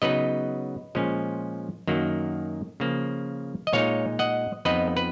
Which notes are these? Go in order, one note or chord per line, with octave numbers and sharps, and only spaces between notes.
C#3 F#3 B3 D#4 B4 D#5
A#2 F3 G#3 C#4
F#2 D#3 F#3 A#3
C#3 F3 A#3
D#5
A#2 G#3 D#4 C#5 F5
D#5 F#5
F2 F3 B3 D#4 B4 D#5
B4